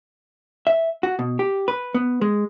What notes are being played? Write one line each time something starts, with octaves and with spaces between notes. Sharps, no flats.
E5
F#4
B2
G4
B4
B3
G#3